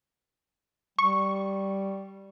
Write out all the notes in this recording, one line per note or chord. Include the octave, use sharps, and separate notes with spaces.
G3 C#6